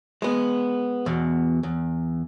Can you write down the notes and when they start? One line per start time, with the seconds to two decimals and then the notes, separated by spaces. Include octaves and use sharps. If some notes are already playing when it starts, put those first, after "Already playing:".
0.22 G#3 B3
1.06 E2 B2
1.63 E2